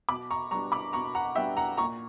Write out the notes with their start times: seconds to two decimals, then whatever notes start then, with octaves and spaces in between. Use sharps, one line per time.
0.09 B2 B5 D6
0.31 A#5 C#6
0.51 G3 B3 D4 A#5 C#6
0.72 B5 D6
0.93 B2 A#5 C#6
1.15 F#5 A#5
1.35 G3 B3 D4 E5 G5
1.57 F#5 A#5
1.77 A#2 A#5 C#6